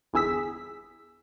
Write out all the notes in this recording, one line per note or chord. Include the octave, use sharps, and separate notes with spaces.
G1 E2 G#4 E6 B6